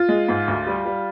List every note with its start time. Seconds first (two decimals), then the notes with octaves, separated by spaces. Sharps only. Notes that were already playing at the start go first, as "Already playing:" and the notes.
Already playing: F4
0.08 G#3
0.28 G#2
0.48 D2
0.67 G3
0.85 G3